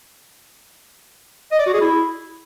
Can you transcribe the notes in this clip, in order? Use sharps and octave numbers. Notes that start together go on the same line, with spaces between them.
D#5
D5
F#4
G#4
E4